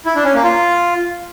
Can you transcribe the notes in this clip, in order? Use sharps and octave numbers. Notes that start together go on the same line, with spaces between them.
E4
D4
C#4
A#3
F4